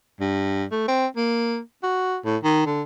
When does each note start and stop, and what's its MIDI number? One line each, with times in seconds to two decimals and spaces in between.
0.20 0.65 43
0.71 0.85 57
0.88 1.07 60
1.17 1.59 58
1.83 2.17 66
2.25 2.37 45
2.43 2.65 51
2.66 2.82 50